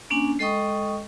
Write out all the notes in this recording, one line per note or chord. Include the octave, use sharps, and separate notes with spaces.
A#3 C#4 D4 G#5
G#3 A4 D#5 G5 C#6 D#6